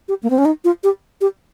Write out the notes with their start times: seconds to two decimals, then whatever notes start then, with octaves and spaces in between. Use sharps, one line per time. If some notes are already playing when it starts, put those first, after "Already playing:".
0.08 G4
0.23 A#3
0.30 C4
0.38 C#4
0.45 D#4
0.65 F4
0.84 G4
1.21 G4